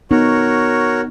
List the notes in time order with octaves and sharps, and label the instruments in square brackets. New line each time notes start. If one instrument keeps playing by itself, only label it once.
[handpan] B3 D#4 [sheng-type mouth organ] F#4 A#4 C#5